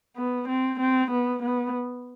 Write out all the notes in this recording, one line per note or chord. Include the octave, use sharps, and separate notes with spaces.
B3
C4
C4
B3
B3